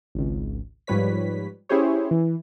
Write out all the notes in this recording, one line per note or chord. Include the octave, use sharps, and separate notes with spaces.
G#1 C#2
G#2 F3 G3 B4 C#5 B6
C#4 E4 G4 G#4 C5 C#5
E3